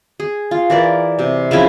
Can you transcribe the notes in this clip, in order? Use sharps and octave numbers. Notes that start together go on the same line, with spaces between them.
G#4
F4
E3 A#4 D5
C3
C#3 F3 E4 G#5